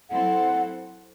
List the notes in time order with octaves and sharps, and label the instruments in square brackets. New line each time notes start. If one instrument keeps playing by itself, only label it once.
[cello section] F#3 C4 E4 A4 C5 [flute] F#5